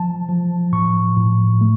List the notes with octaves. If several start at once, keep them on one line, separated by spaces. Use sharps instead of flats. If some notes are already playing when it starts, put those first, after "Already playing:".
Already playing: F3 A5
F3
A2 C#6
A2
A3